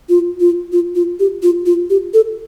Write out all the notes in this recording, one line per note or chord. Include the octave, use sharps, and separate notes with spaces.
F4
F4
F4
F4
G4
F4
F4
G4
A4